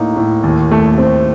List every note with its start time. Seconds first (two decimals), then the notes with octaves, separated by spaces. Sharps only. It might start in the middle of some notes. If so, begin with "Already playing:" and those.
Already playing: A2 A#3 D#4
0.17 A2
0.44 D#2
0.71 A3
0.98 C4